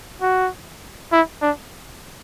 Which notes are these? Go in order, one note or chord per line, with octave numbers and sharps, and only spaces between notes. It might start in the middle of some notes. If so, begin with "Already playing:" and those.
F#4
E4
D4